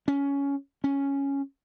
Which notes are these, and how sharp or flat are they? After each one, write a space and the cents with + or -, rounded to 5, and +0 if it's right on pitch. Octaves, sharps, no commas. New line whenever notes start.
C#4 +15
C#4 +0